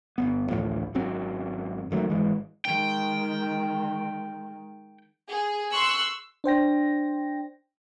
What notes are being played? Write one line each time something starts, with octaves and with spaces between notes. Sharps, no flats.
G1 D#2 B3
A1 D2 A2 F3
G#1 F#2 F#3 C4
F#1 D#3 F#3 A3
G#1 E3 G#3
D#3 G#3 G5
G#4
C6 C#6 E6 F#6
D4 C5 G5 A#6